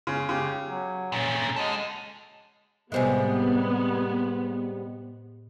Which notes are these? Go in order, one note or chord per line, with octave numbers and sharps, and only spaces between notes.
C#3
C#3 G4
F#3
A#2 C#4
G#3 F#4 A4
A2 C3 G3 G#3 B3 C5 G#5